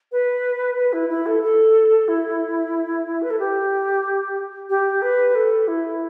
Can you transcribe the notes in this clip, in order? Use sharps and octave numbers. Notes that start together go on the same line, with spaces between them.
B4
B4
E4
E4
A4
A4
E4
B4
A4
G4
G4
B4
A4
E4